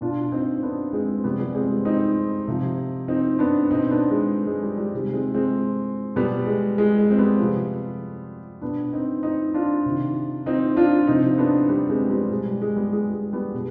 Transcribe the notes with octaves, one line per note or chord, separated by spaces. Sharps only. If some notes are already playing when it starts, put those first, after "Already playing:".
B2 D4 F4
C4 D#4
B3 D4
G#3 C4
C3 F3 G3 B3
G3 B3
G#3 C4
G#3
C4 D#4
C3 F3
C4 D#4
B3 D4
B2 C4 D#4
B3 D4
G#3
G#3
G3
G3
C3 D#3 G#3
G#3 C4
G#3 C4
B2 G3 B3
G#3
G#3
G#3
C4
G3 B3
C3 F3
B2 B3 D4
C4 D#4
C4 D#4
D4 F4
C3 D#3
C4 D#4
D4 F4
C3 F3 C4 D#4
B3 D4
G3 B3
G#3 C4
G3 B3
B2 G#3
G3
G#3
G3 B3
G#3
G#3
G3 B3
B2